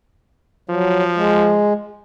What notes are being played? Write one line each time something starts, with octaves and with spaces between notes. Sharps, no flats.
F3 F#3
G#3